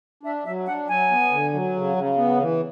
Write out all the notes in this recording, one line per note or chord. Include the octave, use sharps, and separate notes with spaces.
D4 E5
F#3 E5
D4 F#5
F#3 G#5
B3
D3
F#3
C#3
C#3
B3
E3